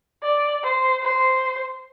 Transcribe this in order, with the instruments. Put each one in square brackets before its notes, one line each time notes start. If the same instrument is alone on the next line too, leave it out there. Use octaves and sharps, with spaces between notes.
[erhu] D5
C5
C5